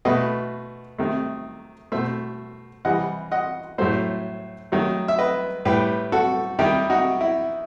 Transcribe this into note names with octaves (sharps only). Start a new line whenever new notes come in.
B2 A3 B4 D#5
C3 D#3 A3
B2 A3 C5 E5
C3 E3 G3 D#5 F#5
D#5 F#5
A2 F#3 A3 C5 E5
D#3 F#3 A3
E5
B4 D#5
A2 G3 G4 B4
F#4 A4
D#3 G3 E4 G4
D#4 F#4
E4